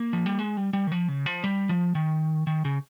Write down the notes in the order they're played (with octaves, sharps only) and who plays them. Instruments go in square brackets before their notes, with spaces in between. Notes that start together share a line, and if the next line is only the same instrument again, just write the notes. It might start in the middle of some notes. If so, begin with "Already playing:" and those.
Already playing: [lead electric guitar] A#3
F3
G3
G#3
G3
G3
D#3
F3
C#3
F3
G3
F3
D#3
D#3
C#3